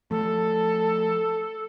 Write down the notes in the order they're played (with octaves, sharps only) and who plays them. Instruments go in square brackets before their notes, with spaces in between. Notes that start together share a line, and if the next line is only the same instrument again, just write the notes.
[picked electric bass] F3 A3 [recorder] A4